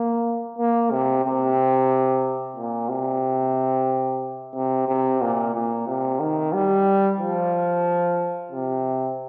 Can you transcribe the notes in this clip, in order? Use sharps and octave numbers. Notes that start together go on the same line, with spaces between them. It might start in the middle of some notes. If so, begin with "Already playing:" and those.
Already playing: A#3
A#3
C3
C3
A#2
C3
C3
C3
A#2
A#2
C3
D#3
G3
F3
C3